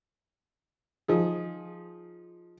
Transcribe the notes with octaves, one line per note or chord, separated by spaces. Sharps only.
F3 D#4 G#4